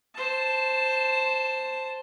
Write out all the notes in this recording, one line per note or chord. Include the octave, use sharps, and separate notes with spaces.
C5 A5